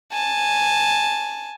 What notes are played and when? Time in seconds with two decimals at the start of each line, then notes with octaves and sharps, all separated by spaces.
0.13 G#5 A5